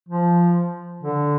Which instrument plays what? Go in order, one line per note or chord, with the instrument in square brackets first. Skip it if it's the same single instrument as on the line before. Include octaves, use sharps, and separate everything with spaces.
[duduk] F3
D3